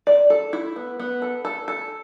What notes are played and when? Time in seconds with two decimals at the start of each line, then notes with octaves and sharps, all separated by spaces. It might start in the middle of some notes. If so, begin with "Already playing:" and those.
0.07 D5
0.30 A4
0.53 E4
0.76 B3
0.99 B3
1.22 A4
1.45 A4
1.68 A4